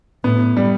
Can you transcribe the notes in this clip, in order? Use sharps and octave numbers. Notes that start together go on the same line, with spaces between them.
A2 B3
G3